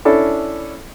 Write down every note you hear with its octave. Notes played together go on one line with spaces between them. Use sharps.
C#4 D4 E4 A4